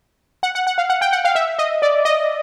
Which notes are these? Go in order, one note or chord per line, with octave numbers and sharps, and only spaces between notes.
F#5
F#5
F#5
F5
F#5
G5
F#5
F5
E5
D#5
D5
D#5